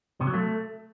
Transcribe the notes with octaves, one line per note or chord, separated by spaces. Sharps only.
C3
F#3
A3